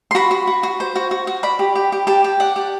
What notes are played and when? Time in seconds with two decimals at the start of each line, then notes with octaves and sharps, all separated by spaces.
0.11 C6
0.15 F#4 B5
0.31 F#4
0.47 F#4
0.63 F#4
0.80 C5
0.96 F#4
1.11 F#4
1.27 F#4
1.43 D5 B5
1.59 G4
1.75 G4
1.92 G4
2.07 G4 A5
2.24 G4
2.40 D5 F#5
2.56 G4